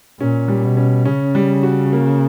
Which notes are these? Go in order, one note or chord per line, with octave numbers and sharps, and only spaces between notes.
A#2 C#4
G3
B2
C#4
C#3 C#4
G3
F#4
A#3